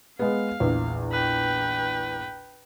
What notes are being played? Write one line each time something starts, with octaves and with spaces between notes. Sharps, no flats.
G#3 B3 F5
A#1 E2
B4 G5